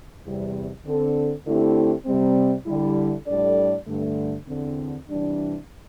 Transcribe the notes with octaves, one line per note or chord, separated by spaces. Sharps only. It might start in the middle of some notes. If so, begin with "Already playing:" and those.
E2 C3 G3
D3 C4 A4
D3 A3 C4 E4 G4
C3 G3 C4
D3 G3 E4
A2 G3 D4 A4 D5
G2 D3 A3
E2 D3 C4
C3 E3 G3 D4